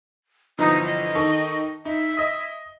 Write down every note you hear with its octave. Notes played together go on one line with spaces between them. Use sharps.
G1 E3 F3 D#4
D#5
D#3 A4 C#6
D#4 E5
D#5 D#6